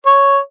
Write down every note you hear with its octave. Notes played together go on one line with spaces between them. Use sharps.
C#5